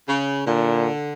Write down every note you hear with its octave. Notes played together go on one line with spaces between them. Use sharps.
C#3
A#2 D3